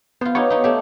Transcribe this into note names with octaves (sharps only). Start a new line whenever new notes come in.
B3 F4 C5
B3 D#4 G4 C#5
D#4 G4
A3 G4